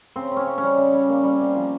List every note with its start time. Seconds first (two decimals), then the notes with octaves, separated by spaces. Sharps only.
0.16 C#3 C4
0.31 C#3
0.36 C#4
0.46 C#3
0.58 G3 C#4
0.78 C#3
0.93 G3
1.09 A#3
1.24 G3
1.40 C3
1.55 F3